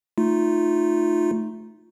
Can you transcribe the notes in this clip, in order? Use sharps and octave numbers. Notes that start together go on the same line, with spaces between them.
A3 D#4 F4